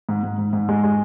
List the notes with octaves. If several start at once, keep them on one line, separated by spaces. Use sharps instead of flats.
G#2
G#2
G#2
G#2
G#3
G#3